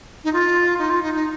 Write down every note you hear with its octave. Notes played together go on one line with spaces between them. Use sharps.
D#4
F4
D#4
F4
D#4
D#4